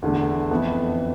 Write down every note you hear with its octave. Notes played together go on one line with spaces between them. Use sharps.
E2 D3 A3
F2 E3 B3